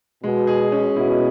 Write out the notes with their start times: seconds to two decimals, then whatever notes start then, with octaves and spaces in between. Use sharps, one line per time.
0.23 B2 G#3
0.47 G#4
0.72 C#4
0.96 B2 E4